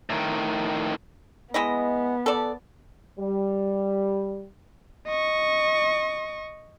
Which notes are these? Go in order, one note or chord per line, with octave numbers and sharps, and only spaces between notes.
A2 D#3
G#3 B3 E4 D#5
A4 D5
G3
D#5 C#6